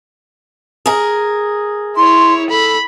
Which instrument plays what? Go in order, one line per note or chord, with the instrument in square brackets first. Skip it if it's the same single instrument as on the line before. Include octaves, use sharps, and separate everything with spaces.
[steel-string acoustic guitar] G#4 A#4
[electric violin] E4 C#5 [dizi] C6
[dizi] A4 [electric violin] B5